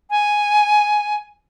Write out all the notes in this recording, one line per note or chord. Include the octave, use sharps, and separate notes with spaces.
G#5